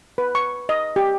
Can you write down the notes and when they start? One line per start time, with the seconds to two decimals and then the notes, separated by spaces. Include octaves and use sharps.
0.18 B4
0.35 C#6
0.69 D#5
0.96 G4